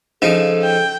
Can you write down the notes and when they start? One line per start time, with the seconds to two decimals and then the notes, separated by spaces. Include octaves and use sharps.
0.22 C#3 F3 D#4 A4
0.63 G5